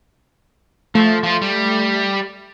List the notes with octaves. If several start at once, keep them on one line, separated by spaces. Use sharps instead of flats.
F3 A3
F3 F4
G3